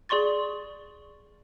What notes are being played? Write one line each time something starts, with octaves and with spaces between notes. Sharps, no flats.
G#4 D5 C6 C#6 A6